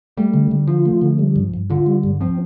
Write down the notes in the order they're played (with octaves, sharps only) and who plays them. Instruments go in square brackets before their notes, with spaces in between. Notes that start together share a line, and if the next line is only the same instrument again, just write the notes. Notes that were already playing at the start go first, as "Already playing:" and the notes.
[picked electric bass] G3 [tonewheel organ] A3
[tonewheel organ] D3
D3
[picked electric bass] F3 [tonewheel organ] F4
[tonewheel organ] A3
D3
G3
G2
G2
[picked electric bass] D3 [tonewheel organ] F4
[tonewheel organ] G3
G2
[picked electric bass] F3 [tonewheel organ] C4